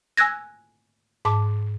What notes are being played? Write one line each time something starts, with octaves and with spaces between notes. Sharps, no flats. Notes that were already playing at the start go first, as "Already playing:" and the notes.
G#5 E6 F#6 G#6 A#6
G#2 A5 D6